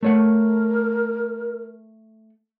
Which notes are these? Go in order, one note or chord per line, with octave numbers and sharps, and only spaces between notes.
A3 A#4 C#5 F#5